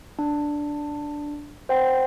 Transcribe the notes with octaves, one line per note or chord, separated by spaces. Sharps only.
D4
C5 F#5 G5